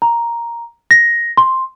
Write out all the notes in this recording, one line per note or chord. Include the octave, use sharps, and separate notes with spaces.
A#5
A#6
C6